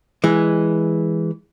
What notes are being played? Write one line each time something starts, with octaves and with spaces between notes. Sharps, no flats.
E3 G#3